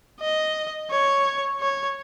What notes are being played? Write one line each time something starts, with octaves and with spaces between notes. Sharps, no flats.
D#5
C#5
C#5